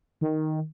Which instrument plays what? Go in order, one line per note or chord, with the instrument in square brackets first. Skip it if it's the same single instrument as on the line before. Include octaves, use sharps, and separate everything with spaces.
[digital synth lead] D#3